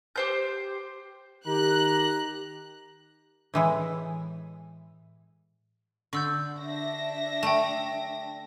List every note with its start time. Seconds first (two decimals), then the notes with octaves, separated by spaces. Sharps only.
0.16 G4 C5 G6
1.47 D#3 G4 A#5 F#6
3.54 A2 E3 G#3
6.13 D3 C#6 E6 G6
6.60 D4 E5 A#6
7.43 A3 G5 A5